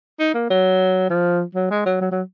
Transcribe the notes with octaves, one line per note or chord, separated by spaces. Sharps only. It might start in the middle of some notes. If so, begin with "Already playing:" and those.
D#4
A#3
F#3
F3
F#3
G#3
F#3
F#3
F#3